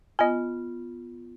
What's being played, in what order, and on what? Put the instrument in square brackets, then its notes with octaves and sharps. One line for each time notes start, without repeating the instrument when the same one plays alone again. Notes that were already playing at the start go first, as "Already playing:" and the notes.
[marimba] B3 F4 [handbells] D#5 G#5